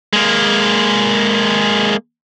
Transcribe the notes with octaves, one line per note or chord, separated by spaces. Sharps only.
G#3 A#3